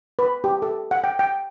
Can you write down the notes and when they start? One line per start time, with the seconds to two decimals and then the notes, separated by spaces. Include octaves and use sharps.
0.19 B4
0.44 G4
0.62 A4
0.91 F#5
1.04 G5
1.19 G5